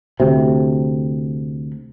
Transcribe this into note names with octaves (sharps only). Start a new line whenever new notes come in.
D2 C3